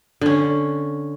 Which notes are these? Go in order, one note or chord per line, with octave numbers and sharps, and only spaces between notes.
D3 C#4